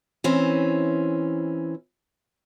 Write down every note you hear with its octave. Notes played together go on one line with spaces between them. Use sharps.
E3 C4 C#4